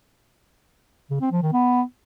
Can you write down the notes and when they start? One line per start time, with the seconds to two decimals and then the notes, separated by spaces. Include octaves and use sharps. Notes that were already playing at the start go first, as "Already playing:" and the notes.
1.10 C#3
1.21 C4
1.32 F3
1.42 D#3
1.53 B3